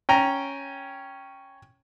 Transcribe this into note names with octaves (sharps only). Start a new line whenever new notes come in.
C#4 G5 A#5